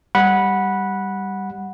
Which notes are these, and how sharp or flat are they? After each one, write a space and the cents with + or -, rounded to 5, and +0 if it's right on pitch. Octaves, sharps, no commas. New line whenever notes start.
G3 +0 F#5 -5 B5 -15